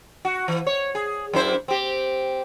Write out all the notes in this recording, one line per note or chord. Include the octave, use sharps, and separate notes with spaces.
F#4
E3
C#5
G#4
F#2 E4 C5
C4 G4